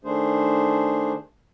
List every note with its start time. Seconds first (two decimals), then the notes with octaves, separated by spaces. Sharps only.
0.04 D#3 A3 D4 G#4 C5